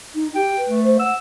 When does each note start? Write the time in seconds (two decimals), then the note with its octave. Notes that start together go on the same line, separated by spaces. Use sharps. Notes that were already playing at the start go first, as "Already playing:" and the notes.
0.15 D#4
0.35 G4 G5
0.57 B4
0.69 A3
0.83 C5
0.99 F#5 E6